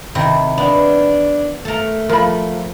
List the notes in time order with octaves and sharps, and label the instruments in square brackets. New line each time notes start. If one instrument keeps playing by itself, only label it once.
[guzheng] C3 D#3 E4
[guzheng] B3 [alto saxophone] D4
[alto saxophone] A3 [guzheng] A4 A#4
[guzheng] F3 [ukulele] A#4 B5